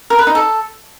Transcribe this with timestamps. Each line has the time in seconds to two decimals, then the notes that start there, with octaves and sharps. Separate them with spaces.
0.10 A#4
0.19 B4
0.27 D#4
0.35 A4